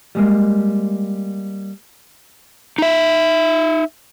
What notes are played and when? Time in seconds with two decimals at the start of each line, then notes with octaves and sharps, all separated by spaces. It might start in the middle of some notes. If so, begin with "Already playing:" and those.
0.15 G3 G#3 A#3
2.78 D#4 E5